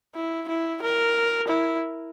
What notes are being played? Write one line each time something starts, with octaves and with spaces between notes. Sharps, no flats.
E4
E4
A#4
E4